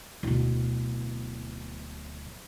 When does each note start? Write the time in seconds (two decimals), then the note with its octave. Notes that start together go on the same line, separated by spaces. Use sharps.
0.23 D1 B2